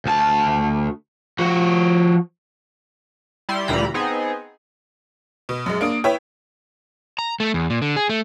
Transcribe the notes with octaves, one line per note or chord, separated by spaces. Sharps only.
D2 A5
F3 F#4
G3 E4 C6
D2 A#2 E3 G3 A#5 B5
B3 C4 D#4 G#4
B2
F#2 G#3
A#3 D4 D#6
E4 B4 C#5 G5
A#5
A3
E2
A#2
D3
G#4
A3